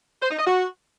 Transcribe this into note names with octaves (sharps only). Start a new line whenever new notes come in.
C5
D#4
D#5
F#4